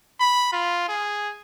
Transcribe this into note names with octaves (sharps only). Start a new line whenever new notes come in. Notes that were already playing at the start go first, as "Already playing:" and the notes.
B5
F4
G#4